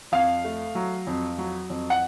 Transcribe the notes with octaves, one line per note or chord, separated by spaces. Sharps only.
F2 F5
A3
F#3
F2
F#3
F2
F#5